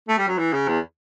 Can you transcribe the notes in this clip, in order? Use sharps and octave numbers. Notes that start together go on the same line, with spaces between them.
A3
G3
F#3
E3
C#3
E2